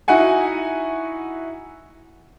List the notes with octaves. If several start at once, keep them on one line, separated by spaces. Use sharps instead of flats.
D#4 E4 F#4 F#5 G#5